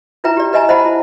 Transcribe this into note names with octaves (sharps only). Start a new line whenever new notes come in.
D#4 E4 B4 E5 G5 A#5
G4 D5
B4 D#5 E5 G#5 A#5
C5 D#5 E5 F#5 A5 B5
E4